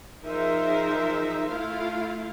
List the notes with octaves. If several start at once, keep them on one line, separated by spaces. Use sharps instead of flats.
F3 D#4 G#4 A#4 C5 E5
A3 E4 F4 F5